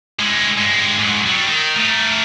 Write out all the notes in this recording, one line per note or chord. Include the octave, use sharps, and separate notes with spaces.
G#3 E4
G2 G#3
G#2 F#3
F#3 G3
D#3
A3 A#4